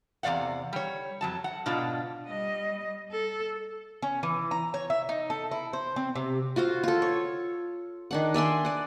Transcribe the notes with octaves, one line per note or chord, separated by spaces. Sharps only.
E2 C3 F3 D5 F5 F#5
G3 C#5
F2 F#3 A5
F#5
G#2 B2 D4 F4
G3 D#5
A4
C#4
E3
A#5
C#5
E5
D#4
A4
E4
C5
C4
C3
F4 F#4 C5 F5
F4 A4
C#5
D#3 D4 F#5
D5 E5 G#5 C6
D5 F#5